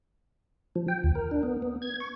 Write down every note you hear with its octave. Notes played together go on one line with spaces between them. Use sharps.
F3
G5
D#2
A#4
D4
B3
B3
G#6
C#6